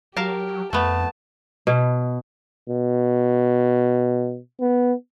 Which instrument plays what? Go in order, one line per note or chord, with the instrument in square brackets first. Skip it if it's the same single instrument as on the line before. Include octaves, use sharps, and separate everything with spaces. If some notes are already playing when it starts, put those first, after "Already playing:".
[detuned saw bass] F#3 [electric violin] G4 [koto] A#4 F5 A5
[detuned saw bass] F2 [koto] A3 B3 [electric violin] A5
[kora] B2
[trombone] B2
B3